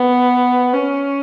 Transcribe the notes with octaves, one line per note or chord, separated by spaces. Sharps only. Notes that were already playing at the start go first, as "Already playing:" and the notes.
Already playing: B3
C#4